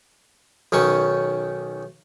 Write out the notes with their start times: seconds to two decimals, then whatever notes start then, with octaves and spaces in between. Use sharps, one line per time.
0.72 B1 D#3 C#4 C#6